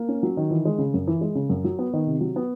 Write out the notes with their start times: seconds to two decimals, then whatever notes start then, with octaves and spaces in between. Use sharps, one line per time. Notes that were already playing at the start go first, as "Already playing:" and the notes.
Already playing: A#3
0.09 C#4
0.23 F#3
0.37 D#3
0.51 E3
0.65 G#3
0.78 C#3
0.94 F#2
1.07 E3
1.21 G#3
1.35 C#3
1.50 F#2
1.64 F#3
1.79 B3
1.93 D#3
2.07 C3
2.21 F#3
2.36 B3